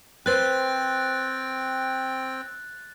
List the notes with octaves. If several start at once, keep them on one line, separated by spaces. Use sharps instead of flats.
C4 B4 C5 G5 F#6 A6